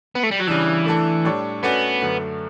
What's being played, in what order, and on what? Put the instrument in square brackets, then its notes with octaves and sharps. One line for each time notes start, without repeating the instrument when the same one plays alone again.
[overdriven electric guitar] B3
A3
G3
F#3
[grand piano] C#3 G3 D4 [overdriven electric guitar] E3
[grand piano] A3 D4 A4
A2 G3 D4 A4 C#5
[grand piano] A3 C#4 F#4 B4 D5 [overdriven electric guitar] B3
[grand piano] F#2 D3 A3